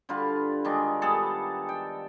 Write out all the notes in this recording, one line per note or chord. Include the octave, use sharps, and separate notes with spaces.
D3 G3 F4 B4
D#3 G#3 D4
G3 B3 G#4 A4
G5